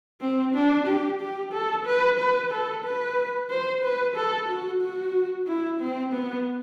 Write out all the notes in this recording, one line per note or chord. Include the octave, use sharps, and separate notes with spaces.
C4
D4
G4
G4
A4
B4
B4
A4
B4
C5
B4
A4
F#4
F#4
E4
C4
B3